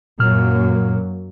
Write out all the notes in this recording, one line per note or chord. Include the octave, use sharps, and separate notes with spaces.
F#2 A#2 F#3 A#3 F6